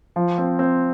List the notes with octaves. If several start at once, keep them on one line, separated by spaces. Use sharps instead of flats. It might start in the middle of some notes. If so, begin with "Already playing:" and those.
F3
C4
C4